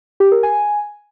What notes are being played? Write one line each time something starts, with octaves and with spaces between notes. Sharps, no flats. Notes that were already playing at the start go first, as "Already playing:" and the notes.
G4
A#4
G#5